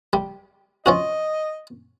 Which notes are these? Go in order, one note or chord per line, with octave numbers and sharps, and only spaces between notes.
G3
F3 C#4 F#4 D#5